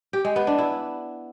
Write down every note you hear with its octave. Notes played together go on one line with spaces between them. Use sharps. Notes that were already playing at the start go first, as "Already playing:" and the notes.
G4
G#3
B3
D4
E4